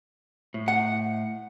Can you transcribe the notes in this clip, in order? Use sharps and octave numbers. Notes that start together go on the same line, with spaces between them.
A2
F#5